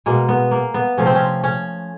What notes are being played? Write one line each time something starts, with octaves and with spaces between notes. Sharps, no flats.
B2 G#3 A#3
B3
A#3
B3
C3 F3 A3 C#4
C4
C#4
C#4